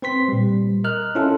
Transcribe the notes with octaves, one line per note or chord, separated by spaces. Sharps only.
C4 B4 C6 B6
A#2 G3
A#4 D#5 F6 F#6
C#4 E4 F4 A4